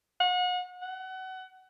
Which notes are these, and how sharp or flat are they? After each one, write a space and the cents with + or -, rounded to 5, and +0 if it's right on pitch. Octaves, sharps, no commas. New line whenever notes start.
F#5 -35
F#5 +25